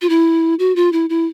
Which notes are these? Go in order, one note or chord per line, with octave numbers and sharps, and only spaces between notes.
F4
E4
F#4
F4
E4
E4